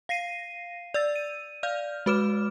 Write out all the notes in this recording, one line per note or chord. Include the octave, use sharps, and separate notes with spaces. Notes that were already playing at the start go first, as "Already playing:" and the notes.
F5 A#6 C7 D#7
D5 E6 A6
D#7
D5 F5 F6 G6
G#3 F#4 B4 D6 F6 E7